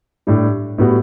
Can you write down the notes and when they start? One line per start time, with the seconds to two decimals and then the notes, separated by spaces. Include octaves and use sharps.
0.27 A2 G3 D4 G4
0.78 A2 G3 B3 F#4